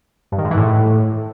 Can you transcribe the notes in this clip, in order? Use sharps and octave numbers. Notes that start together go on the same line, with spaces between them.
G2
D#3
G#2
E3
A2